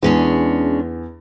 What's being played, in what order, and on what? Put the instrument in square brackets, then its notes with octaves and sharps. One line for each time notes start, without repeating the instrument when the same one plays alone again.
[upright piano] E2 [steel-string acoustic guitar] G#3 C#4 D4